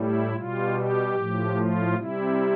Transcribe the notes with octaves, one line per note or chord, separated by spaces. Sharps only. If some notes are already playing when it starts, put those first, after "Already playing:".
Already playing: A2 G3 E4
B2 G3 F4
G4
A2 F3
F4
C3 G3 E4